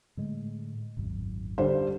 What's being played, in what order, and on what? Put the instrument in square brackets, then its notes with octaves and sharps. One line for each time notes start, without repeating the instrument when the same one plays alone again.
[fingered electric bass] A2 D3 G#3
D#1 G#1 F#2
[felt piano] D3 G3 C5